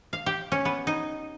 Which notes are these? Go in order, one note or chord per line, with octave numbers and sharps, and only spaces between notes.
F5
G4
C#4
B3
D#4